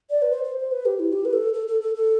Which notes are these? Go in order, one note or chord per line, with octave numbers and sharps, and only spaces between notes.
D5
B4
C5
C5
C5
B4
G4
E4
G4
B4
A4
A4
A4
A4
A4